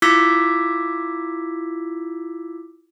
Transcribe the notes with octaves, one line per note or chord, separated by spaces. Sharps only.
E4 F4 D6 E6 G#6 B6